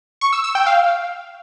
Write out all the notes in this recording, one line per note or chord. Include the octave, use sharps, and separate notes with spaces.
C#6
E6
E6
G5
F5